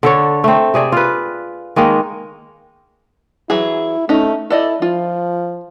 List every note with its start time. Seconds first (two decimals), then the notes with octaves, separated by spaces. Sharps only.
0.03 D3 A4 C#5
0.44 A3 C4
0.74 C3 G#4 D5 E5
0.92 F4 B4
1.76 D#3 G#3 A#3 D#4
3.50 E3 F#3 E4 G#4
4.09 A3 C#4 D#4
4.50 E4 A4 D5 D#5
4.82 F3 F4